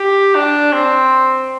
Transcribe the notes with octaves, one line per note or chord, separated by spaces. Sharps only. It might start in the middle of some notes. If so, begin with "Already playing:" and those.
Already playing: G4
D4
C4